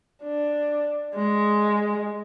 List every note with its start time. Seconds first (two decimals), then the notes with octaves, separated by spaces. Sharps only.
0.23 D4
1.15 G#3